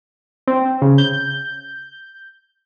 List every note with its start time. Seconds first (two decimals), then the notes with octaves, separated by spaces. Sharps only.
0.47 C4
0.82 C#3
0.98 G6